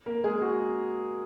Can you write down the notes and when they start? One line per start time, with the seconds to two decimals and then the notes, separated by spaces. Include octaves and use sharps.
0.06 A#3 A#4
0.24 G#3 G#4
0.42 F#4